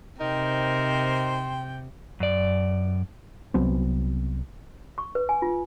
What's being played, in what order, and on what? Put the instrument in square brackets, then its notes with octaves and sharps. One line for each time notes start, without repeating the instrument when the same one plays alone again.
[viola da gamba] C3 [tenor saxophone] D#4 [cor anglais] A#4 [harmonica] C5 G5
[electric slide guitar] F#2 D5
[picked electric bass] C2 F#3 B3 C4
[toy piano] C#6
B4
G#5
F4